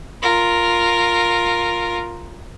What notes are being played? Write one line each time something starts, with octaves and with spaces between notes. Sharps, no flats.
F4 A#4